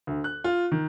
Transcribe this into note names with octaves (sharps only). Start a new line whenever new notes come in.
D2
F#6
F4
D#3